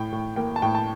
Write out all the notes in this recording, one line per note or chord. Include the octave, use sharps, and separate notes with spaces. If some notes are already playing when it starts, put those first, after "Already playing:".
Already playing: A2 G5
A2
A#3 G5
A5
A2 G5
A5